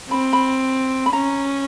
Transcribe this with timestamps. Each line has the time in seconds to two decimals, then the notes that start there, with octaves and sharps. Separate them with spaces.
0.10 C4 B5
0.33 B5
1.06 B5
1.13 C#4 A#5